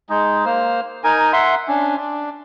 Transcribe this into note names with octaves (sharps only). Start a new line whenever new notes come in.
G#3 D#4
A#3 C5
D#4 A#4 G#5
E5 F#5 C6
C#4 D4
D4